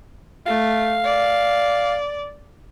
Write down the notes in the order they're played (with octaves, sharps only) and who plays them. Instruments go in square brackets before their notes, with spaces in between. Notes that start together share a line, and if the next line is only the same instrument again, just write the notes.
[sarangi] A3 [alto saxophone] F5
[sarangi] D5